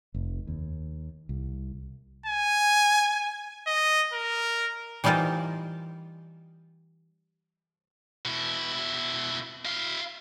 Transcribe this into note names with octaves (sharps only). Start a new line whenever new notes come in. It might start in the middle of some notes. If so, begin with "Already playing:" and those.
F1
D#2
C2
G#5
D#5
A#4
E3 G3 D#4 F4 A#4 C5
B2 E4
E4 F5